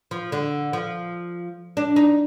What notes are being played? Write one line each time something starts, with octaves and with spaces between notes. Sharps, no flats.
F3
D3
F3
D4
D#4